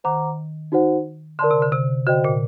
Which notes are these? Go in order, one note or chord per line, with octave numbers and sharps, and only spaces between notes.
D#3 C5 F#5 A#5 D6
D#4 F#4 C5 F#5
D3 A#4 D5 A5 C6
C3
D3
C3
D3 F#4 C5 D#5 G5
A#2